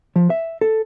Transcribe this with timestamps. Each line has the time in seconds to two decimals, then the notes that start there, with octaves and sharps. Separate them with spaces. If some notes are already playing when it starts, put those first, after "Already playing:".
0.16 F3
0.30 E5
0.61 A4